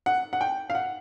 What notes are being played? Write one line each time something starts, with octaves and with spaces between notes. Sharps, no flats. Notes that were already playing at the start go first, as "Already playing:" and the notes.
F#5
F#5
G5
F5
F#5